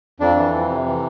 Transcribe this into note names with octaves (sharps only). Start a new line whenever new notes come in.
F2 D4
E3
F2
C3
E3